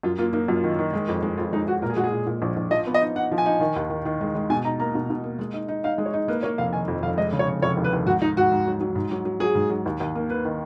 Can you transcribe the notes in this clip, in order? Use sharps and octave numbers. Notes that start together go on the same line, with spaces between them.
F#2 F4
A#3 F4
A#3 D#4
F#2 F4
D#3
D#3
G#3
F2
G#3
F2 F4
G#3 D#4
G#3 F#4
A#2 A#4
G#4
G#3 F#4
G#4
A#2
A#2
A#1
A#1
F3 D#5
B3
D#5
D#4
D#4 F#5
F3
G#5
D#4
D#3
D#2
D#3
D#3
G#3
G#3
B2 G#5
D#4 A#5
A#3 A#5
B2
B2
A#3
G#3
D#4
D#4
D#4 F5
G#3
C#5
D#4
A#3 B4
A#3 C#5
F1 F5
D#3 G#5
F2
F1 F5
G#3 D#5
C#3
C#5
F1
F1 C#5
D#2
B4
D#2
G#2 F#4
G#2 D#4
G#2 F#4
G#2
F#3
F#3
G#2
F#3
F#3
F#3 G#4
G#2
F#3
D#2
D#2
A#3
A#3 B4
D#3